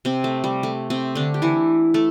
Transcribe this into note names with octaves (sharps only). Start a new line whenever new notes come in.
C3 C4
A3
G3
A3
C3 C4
D3 D4
G4
E3 E4
A3 A4